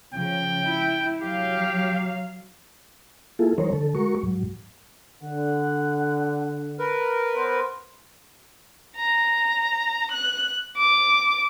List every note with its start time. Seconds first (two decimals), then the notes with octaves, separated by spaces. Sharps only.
0.13 C#3 F3 G5
0.64 E4
1.22 F#3 G4 F5
3.39 A#3 E4 F4 G#4 A4
3.58 E3 G3 D#4 A#4 C5 C#5
3.73 D3 A4
3.95 G#3 F#4 A#4 C#6
4.23 G#2 F#3
5.23 D3 F#5
6.79 A#4 B4
7.36 B3 C5
8.97 A#5
10.11 F#6
10.77 D6